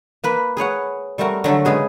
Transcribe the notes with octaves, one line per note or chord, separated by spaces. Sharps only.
A#3 B4 B5
G#4 B4 C#5 F#5
G3 A3 C4 F#4 A#4
D3 F#3 A3 A4
C#3 G#3 G#4 B4